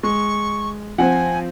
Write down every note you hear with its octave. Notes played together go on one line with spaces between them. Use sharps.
G#3 C#6
F3 C4 C5 F#5 G#5